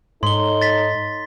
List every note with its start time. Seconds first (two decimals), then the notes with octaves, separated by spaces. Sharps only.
0.23 G#2 D#4 A4 C#5 C6 G7
0.61 A6 B6